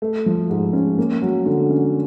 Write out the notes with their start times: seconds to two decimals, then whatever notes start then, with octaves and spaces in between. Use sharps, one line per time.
0.02 A3
0.26 F3
0.50 G#2
0.73 C#4
0.98 A#3
1.22 F#3
1.46 D3
1.70 C#4